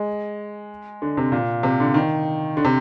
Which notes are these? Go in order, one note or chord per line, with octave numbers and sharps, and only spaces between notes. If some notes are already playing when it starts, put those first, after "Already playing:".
Already playing: G#3
D3
C3
A#2
C3
D3
D#3
D3
C3